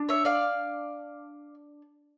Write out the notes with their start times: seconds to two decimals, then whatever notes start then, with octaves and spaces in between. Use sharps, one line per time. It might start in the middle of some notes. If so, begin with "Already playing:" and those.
Already playing: D4
0.09 C#5 E5
0.25 D5 F5